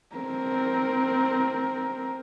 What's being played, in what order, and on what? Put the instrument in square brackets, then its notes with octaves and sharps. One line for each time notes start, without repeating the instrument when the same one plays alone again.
[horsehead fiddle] C4 A#4